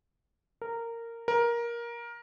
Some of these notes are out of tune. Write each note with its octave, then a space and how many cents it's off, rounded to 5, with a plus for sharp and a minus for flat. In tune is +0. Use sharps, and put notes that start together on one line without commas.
A#4 -15
A#4 +15